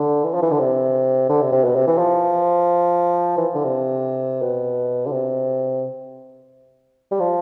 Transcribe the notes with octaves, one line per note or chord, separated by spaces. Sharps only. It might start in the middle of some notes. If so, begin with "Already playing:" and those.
Already playing: D3
E3
F3
E3
D3
C3
D3
C3
C3
B2
C3
E3
F3
E3
D3
C3
B2
D3
C3
G3
F3